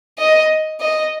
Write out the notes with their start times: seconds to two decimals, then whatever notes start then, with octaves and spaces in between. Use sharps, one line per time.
0.19 D#5
0.80 D#5